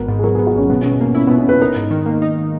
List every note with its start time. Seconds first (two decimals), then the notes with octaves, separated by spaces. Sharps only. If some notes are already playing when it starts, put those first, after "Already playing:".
Already playing: G#1 B3 A#4
0.08 G#2
0.19 G#4
0.23 F#3 A#4
0.35 B3 G#4
0.47 F#4
0.55 G#1 C#4
0.70 B2 B3
0.81 B2 C#4
0.92 B3
1.01 A#3
1.15 C#4 E4
1.27 B2 B3
1.38 C#4
1.46 B2 B4
1.61 D#4 A#4
1.76 G#2
1.91 D#3
2.06 A#3
2.22 D#4